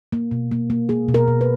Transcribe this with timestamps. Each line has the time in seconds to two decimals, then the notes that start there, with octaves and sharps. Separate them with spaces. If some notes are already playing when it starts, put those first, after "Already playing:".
0.13 A#3
0.31 B2
0.51 A#3
0.70 A#3
0.89 A#3 G#4
1.09 B2
1.14 A#4
1.28 B2
1.41 B4